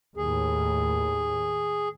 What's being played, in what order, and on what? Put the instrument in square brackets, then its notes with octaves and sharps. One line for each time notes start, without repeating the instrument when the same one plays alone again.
[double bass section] D#2 A2 [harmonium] G#4